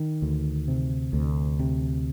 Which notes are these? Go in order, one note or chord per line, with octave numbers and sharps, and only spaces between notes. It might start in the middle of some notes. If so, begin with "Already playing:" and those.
Already playing: D#3
D2
C3
D2
C3